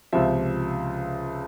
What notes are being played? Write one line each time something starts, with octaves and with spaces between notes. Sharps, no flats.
C#2 C3 F3 E5